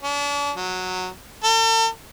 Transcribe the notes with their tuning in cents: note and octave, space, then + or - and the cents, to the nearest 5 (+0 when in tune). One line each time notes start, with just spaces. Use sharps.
D4 -40
F#3 -10
A4 +40